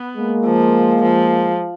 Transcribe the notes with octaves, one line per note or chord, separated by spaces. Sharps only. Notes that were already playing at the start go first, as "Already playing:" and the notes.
Already playing: B3
G#3 A#3
F3
F3